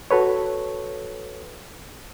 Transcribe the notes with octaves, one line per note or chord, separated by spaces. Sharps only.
F#4 A4 B4 C#5